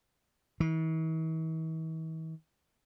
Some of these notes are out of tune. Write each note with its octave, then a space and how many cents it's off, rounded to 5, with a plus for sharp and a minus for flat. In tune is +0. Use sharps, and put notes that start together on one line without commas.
E3 -45